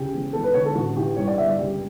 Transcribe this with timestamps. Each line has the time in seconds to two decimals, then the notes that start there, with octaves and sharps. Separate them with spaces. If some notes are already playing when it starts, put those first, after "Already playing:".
Already playing: C#3 G4
0.13 E1
0.33 E1 A4
0.44 B4
0.54 D3 C#5
0.65 A4
0.75 A1 F#4
0.97 E3 G4
1.17 G2 C#5
1.27 D5
1.38 G1 E5
1.48 D5
1.58 C#2 G4